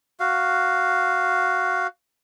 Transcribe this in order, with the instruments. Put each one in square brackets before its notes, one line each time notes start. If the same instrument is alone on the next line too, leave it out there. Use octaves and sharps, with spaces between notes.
[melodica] F#4 F5